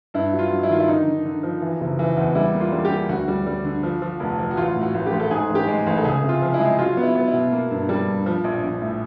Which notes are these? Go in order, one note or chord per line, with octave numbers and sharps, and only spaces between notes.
G2 E4
F#3
F4
F#3
E4
D#3 F4
E4
D3 D#4
D3
D3
F3
E3
F#1
E3
E2
G3 E4
A#3
F4
G3
G4
A#3
D2 F#4
G3
G3
D3
F3
F3
F1
F3
F#4
A1 F4
A2
F#4
A1
G4
A1
A4
G#2 G#4
A1
G4
G#3
A1
A4
C#2 G#4
C3
F4
F3
E4
G#3
F#3 F4
B3
E4
B3
E4
B2
A#3
G2
G3
G2
F3
A#1
A#1
A2